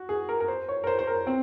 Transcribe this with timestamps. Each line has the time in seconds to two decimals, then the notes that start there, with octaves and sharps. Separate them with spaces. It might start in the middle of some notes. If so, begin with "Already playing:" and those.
Already playing: F#4
0.09 G#4
0.29 A#4
0.40 A#4
0.48 C5
0.69 C#5
0.84 A#4
0.87 C5
0.99 C5
1.07 A#4
1.27 C4